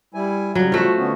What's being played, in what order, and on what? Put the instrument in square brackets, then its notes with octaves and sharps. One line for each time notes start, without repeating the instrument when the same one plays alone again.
[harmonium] G3 E4 G#5
[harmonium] C#3 G3 [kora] F#3
[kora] F3 A3 F#4
[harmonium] D3 B3 C#4